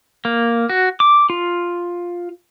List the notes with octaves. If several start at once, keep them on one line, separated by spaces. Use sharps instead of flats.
A#3
F#4
D6
F4